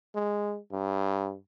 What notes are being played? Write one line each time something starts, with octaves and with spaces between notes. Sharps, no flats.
G#3
G2